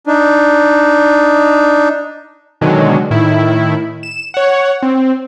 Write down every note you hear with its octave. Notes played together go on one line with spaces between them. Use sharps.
D4 D#4
B2 D3 D#3 F#3 G#3
A2 D#3 E4
E7
C#5 F#5
C4